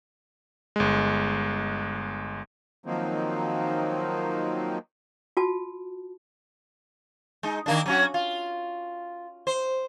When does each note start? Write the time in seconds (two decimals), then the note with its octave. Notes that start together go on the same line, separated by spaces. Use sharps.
0.76 G1 G#3
2.86 D#3 F3 F#3 A#3 C4 D#4
5.37 F4 F#4 A5
7.43 G#3 D#4
7.66 D#3 A#3 D4
7.86 F#3 C#4 F#4
8.14 F4
9.47 C5